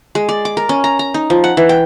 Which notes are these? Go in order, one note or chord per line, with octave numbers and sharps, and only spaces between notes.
G#3
D5
D6
A#4
C#4
A#5
A#5
D#4
F3
F#5
E3
G5